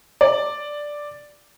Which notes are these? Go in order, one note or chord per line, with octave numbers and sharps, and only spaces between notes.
D5